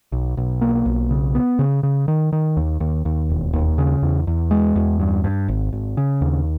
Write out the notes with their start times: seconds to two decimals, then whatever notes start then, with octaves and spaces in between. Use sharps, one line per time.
0.12 B1
0.37 B1
0.61 A#3
0.86 B1
1.11 C#3
1.35 B3
1.59 C#3
1.83 C#3
2.08 D#3
2.33 D#3
2.57 D#2
2.80 D#2
3.05 D#2
3.30 E1
3.53 D#2
3.78 C#3
4.02 E2
4.27 E2
4.51 G#3
4.76 E2
5.00 G2
5.24 G2
5.48 G#1
5.73 G#1
5.97 C#3
6.21 D#2